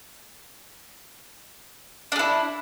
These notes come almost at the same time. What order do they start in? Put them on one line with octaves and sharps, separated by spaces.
D4 G#4 E4